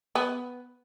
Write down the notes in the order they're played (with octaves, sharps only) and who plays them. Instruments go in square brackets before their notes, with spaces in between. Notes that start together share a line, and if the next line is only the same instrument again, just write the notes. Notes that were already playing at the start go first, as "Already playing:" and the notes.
[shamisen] B3